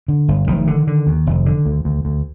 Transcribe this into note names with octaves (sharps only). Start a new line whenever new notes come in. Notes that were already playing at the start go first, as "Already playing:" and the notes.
D3
G1
F1 D#3
D3
D3
D#2
F1
D3
D2
D2
D2